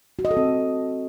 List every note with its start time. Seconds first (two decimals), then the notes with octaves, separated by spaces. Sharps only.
0.19 F#4
0.25 D#5
0.31 A4
0.37 C4